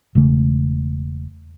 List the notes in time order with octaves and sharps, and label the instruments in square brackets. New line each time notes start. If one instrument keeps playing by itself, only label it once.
[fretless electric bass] E1 C#3 A3